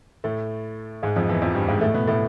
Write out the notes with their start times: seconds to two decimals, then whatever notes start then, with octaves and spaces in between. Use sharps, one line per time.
0.24 A2 A3
1.03 G#2 G#3
1.16 F2 F3
1.29 E2 E3
1.42 F2 F3
1.55 G2 G3
1.68 G#2 G#3
1.81 A2 A3
1.94 B2 B3
2.07 A2 A3